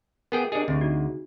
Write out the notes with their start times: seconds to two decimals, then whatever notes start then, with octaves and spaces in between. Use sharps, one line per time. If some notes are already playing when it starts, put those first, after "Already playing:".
0.32 B3 G#4 A#4 G5
0.52 D4 G4 G#4 D#5
0.68 D2 C4 G#4
0.81 D#4 F#4